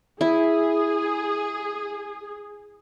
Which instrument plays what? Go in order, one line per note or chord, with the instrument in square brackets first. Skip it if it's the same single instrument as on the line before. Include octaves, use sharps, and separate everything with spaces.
[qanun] E4 [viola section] G#4